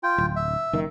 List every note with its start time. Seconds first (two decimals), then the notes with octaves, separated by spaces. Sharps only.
0.03 F4 G5
0.18 D1
0.36 E5
0.73 F#1 D#3